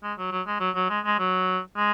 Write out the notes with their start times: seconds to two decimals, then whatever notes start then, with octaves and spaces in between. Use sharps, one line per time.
0.03 G#3
0.18 F#3
0.31 F#3
0.47 G#3
0.60 F#3
0.75 F#3
0.90 G#3
1.05 G#3
1.19 F#3
1.77 G#3